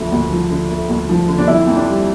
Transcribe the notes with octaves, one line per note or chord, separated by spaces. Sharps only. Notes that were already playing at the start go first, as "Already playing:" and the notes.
Already playing: D2 D3 F3 A3
D2
F3
D3
A3
D2
F3
D3
D4
F2 E4
F2
D4
G3